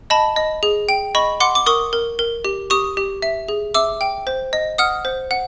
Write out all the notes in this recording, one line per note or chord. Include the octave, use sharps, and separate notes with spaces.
D#5 A5 B5
D#5
G#4
G5
D#5 B5 C#6
F#5 C6 D6
D6
A#4 C#6 D#6
A#4
A#4
G4
G4 C#6 D#6
G4
E5
G#4
E5 D6 E6
G5
C5
D#5
F#5 D#6 F6
C5
F#5